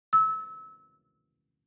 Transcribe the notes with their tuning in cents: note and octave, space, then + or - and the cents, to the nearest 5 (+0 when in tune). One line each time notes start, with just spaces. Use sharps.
E6 -25